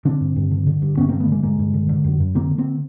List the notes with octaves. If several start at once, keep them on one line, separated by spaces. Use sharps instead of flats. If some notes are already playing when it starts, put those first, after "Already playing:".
D3 C4 D4
G2
G2
D3
D3
G2
G2 B3 C#4
A#3 C4
D3
A3 B3
D3 G#3 A#3
G2 G#3 A#3
G2
D3
D3
F#2
F#2
D3 A#3 C4
D3
A#3 C4